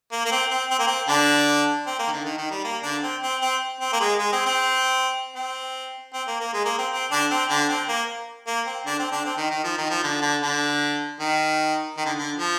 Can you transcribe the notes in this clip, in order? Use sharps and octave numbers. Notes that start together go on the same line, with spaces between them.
A#3
A#3
C4
C4
C4
A#3
C4
D3 D4
C4
A#3
D#3
D3
D#3
D#3
G3
A#3
D3 D4
C4
C4
C4
C4
A#3
G#3
G#3
C4
C4
C4
C4
A#3
A#3
G#3
A#3
C4
C4
D3 D4
C4
D3 D4
C4
A#3
A#3
C4
D3 D4
C4
D3 D4
C4
D#3
D#3
F3
D#3
F3
D3
D3
D3
D#3
D#3
D3
D3
F3